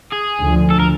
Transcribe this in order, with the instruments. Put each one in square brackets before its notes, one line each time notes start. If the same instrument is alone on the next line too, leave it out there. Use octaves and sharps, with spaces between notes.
[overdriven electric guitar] G#4
[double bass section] D2 D3 F3
[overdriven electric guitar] A4
A#4